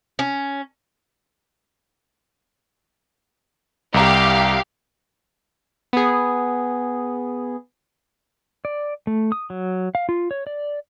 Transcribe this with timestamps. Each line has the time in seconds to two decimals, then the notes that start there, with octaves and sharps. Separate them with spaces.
0.19 C#4
3.94 C2 G4 F5 A#5
5.93 B3 G#4
8.65 D5
9.07 A3
9.32 D#6
9.50 F#3
9.95 F5
10.09 F4
10.31 C#5
10.47 D5